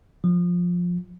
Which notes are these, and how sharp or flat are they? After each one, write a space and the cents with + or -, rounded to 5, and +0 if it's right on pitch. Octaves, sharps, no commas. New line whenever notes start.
F3 +15